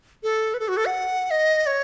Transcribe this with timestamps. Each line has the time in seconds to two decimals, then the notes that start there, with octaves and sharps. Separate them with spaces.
0.23 A4
0.54 B4
0.59 A4
0.68 F#4
0.77 A4
0.86 F#5
1.31 D#5
1.66 C#5